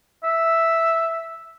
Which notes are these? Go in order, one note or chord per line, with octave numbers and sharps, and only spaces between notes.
E5